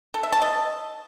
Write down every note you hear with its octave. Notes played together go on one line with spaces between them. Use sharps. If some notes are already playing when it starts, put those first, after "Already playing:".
A4
E5
A5
D#5